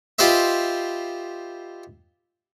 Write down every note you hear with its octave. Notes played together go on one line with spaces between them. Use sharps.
F4 G4 B4 C5 D#5 E5